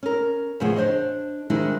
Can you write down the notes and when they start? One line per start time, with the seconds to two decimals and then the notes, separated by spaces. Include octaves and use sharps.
0.03 C#4 A#4
0.60 E2 A2 C#3 F3 G#4 F#5
0.76 D4 C5 C#5 D#5
1.50 D#3 F3 G3 G#3 D4 E4